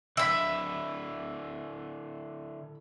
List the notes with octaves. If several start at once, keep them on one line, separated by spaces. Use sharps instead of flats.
D3 E4 E5 B5